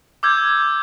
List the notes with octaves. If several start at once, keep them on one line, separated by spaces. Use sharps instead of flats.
D6 E6 G6 G#6